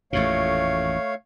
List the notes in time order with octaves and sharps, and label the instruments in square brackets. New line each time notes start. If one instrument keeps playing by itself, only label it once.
[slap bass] A1 F2 A#2 [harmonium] A3 C#5 F5